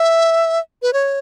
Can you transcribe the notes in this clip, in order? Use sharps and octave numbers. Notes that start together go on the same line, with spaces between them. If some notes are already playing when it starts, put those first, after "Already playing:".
Already playing: E5
B4
C#5